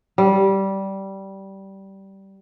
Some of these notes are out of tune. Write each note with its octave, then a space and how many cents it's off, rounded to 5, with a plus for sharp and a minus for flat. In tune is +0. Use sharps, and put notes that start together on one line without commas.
G3 -15